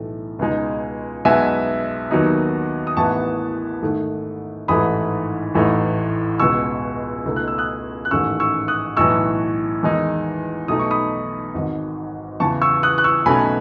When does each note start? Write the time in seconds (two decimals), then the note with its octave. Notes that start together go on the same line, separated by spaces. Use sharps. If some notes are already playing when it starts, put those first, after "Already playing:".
Already playing: B1 A2 E3 A3
0.39 C#2 B2 G#3 D#4
1.25 B1 B2 G#3 B3 E5 G#5
2.11 D#2 D#3 F#3 B3 D#4
2.87 D#6
2.96 A1 A2 E3 B3 D#4 A5 C#6
3.82 G#2 D#3 A3
4.68 A1 G#2 E3 A3 D#4 B5 D#6
5.54 A1 A2 E3 A3 D#4
6.40 C#2 B2 G#3 C#6 E6
7.26 C#2 B2 A3 D#4
7.36 F#6
7.48 E6
7.58 D#6 F#6
8.05 F#6
8.11 A1 G#2 D#3 A3 C#4 C#6 E6
8.40 C#6 E6
8.68 D#6 F#6
8.97 B1 A2 E3 C#6 E6
9.83 E2 D#3 G#3 D#4
10.68 B1 B2 A3 D#4 D#6
10.79 C#6
10.91 B5 D#6
11.54 G#1 G#2 D#3
12.40 E2 C#3 E3 A5 C#6
12.62 C#6 E6
12.83 D#6 F#6
12.98 F#6
13.04 C#6 E6
13.26 B1 B2 A3 C#4 G#5 B5